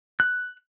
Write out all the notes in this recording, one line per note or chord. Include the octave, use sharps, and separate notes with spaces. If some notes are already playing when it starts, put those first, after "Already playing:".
F#6